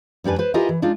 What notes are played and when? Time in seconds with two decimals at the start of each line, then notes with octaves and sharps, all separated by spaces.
0.24 F2 G3 D4 B4 G#5
0.38 B4 C5
0.54 E4 F4 G4 G#4 A#4 D#5
0.69 E3
0.82 G#3 D4 D#4 F4